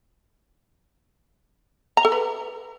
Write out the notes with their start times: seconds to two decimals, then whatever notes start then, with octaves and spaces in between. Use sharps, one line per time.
1.97 A#5
2.05 A4
2.12 B4